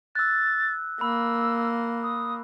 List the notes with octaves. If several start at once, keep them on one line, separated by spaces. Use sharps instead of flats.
E6 F#6 A6
A#3 B5 E6
D#6